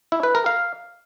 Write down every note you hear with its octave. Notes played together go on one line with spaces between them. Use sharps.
E4
B4
A#4
F5